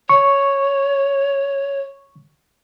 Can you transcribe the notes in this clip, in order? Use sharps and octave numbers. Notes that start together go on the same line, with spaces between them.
C#5 C#6